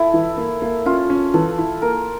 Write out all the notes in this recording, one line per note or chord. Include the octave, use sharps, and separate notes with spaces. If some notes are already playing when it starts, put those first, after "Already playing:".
Already playing: E4 A4
E3
A#3
A#3
C#4 F4
C#4
E3 A4
E4
A#3 A#4